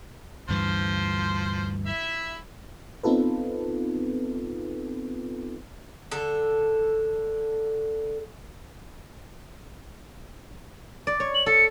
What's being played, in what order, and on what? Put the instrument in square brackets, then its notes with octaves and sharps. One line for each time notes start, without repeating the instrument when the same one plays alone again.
[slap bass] D2 G2 E3 [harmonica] F3 C5
[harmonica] E4 E5
[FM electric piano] B3 C4 D#4 F4 A4 B4
[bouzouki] D3 A4
[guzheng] D5
C#5
[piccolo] F#7
[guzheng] A4 [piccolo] C#7